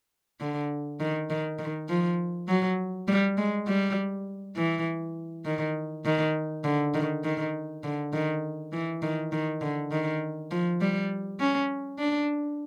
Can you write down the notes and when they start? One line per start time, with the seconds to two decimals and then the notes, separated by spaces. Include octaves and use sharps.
0.40 D3
1.00 D#3
1.30 D#3
1.59 D#3
1.89 F3
2.48 F#3
3.08 G3
3.37 G#3
3.67 G3
4.56 E3
5.45 D#3
6.05 D#3
6.64 D3
6.94 D#3
7.24 D#3
7.83 D3
8.13 D#3
8.72 E3
9.02 D#3
9.32 D#3
9.61 D3
9.91 D#3
10.51 F3
10.81 G3
11.40 C#4
11.99 D4